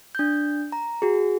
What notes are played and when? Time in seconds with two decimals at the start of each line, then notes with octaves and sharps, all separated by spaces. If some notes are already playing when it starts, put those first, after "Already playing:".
0.15 D4 G6
0.72 A#5
1.02 F#4 G#4